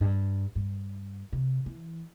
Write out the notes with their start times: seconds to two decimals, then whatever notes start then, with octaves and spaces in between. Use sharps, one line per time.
0.01 G2
0.55 G2
1.33 C3
1.66 E3